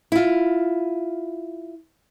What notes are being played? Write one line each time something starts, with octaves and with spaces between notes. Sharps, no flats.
E4 F4